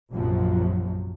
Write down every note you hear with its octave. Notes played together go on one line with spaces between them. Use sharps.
A#1 F#2 C3 F3 F#3